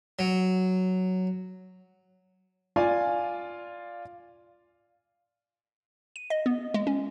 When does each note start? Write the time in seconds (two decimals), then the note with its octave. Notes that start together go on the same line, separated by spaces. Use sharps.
0.19 F#3
2.76 F4 D5 F5 G#5
6.16 D#7
6.30 D#5
6.46 B3
6.74 G#3
6.87 C#4